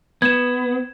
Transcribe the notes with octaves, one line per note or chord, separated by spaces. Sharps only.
B3 G#6 E7